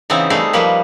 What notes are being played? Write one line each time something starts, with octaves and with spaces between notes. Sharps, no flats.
C#3 E3 B3 C4 D#4
G3 A3 D#4 G#4
F3 G3 A#3 B4